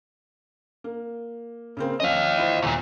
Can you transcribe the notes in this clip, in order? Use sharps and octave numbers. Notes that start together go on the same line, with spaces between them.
A#3
C#3 A#3 C4
F3 C#4 D#5 F5
E4 F4 C5
D#1 E2 A#2